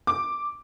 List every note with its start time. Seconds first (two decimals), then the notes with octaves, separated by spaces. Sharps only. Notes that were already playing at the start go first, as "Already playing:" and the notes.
0.07 D6